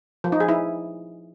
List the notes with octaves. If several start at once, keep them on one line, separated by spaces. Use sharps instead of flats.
F3
D#4
G#4
E4